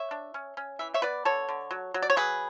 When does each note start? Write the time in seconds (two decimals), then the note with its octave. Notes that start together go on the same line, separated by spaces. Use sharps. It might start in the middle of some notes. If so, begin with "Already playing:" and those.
Already playing: C#5 E5
0.11 D4
0.34 C#4
0.57 C#4
0.79 E3 E5
0.94 C#5 E5
1.02 B3 B4 D5
1.25 D3 A4 C#5
1.49 D3
1.71 F#3
1.94 F#3
2.02 D5
2.10 C#5
2.16 F#3 G#4 B4